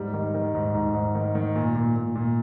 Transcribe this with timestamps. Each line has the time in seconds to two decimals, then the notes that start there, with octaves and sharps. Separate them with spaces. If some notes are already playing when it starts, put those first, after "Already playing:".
Already playing: G#2 G3
0.13 D#3
0.34 D#3
0.55 G#2
0.74 G#2
0.94 G#2
1.15 D#3
1.35 D#3
1.55 A#2
1.75 A#2
1.96 A#2
2.15 A#2